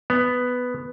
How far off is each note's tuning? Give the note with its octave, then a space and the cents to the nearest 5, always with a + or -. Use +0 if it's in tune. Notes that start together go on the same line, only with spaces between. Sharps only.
B3 +5